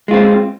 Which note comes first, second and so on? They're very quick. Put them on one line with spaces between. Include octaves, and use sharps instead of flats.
G#3 F4 C4